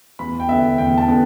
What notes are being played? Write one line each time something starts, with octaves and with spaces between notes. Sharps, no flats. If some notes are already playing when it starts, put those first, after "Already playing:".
E2 B5
G5
D3 B3 E5
E2 G5
A5
D3 B3